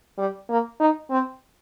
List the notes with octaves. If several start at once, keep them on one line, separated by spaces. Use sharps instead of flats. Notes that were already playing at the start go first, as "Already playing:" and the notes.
G3
A#3
D#4
C4